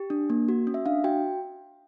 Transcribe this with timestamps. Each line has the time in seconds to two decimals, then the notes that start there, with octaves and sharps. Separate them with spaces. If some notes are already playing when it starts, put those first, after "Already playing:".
Already playing: G4
0.10 D4
0.30 A#3
0.48 F#4
0.67 C#4
0.74 E5
0.86 D4 F5
1.04 F#4 G5